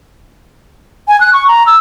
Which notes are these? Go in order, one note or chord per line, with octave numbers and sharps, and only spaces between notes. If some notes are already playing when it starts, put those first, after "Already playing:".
G#5
F#6
C#6
A#5
E6